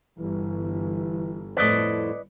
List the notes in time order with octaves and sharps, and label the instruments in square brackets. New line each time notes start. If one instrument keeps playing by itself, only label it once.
[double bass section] G1 [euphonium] E3
[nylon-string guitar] F2 A2 [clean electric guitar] B4 D5 D#5